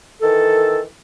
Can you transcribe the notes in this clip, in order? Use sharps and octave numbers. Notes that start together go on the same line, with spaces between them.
D#3 E3 A4